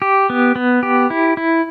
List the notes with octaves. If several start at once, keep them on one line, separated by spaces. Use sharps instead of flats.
G4
B3
B3
G4
E4
E4